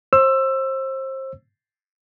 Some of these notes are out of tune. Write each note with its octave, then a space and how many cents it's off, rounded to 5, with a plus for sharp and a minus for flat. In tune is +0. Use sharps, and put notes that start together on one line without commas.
C5 +30 E6 +15